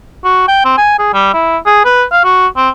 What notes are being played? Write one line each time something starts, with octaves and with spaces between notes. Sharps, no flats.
F#4
G5
C4
G#5
G#4
G3
E4
G#4
B4
F5
F#4
C4